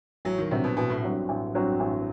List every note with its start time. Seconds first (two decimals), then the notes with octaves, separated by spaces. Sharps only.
0.25 A1 F#3
0.38 D#3
0.51 G2 C3 F#3 C4 F#4
0.64 B2
0.77 A1 B2
0.90 A2
1.03 G2 F#3 C4 F#4
1.29 A1
1.54 G2 F#3 C4 F#4
1.80 A1